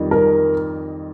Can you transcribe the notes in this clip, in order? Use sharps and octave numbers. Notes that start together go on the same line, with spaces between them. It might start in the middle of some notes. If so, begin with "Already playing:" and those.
Already playing: F2 D#3 G3
A#4